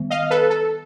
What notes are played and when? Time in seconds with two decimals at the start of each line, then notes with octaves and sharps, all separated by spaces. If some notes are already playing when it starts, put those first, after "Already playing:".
Already playing: D#3 G3 B3
0.10 D#5 F5
0.30 A4 B4
0.50 A4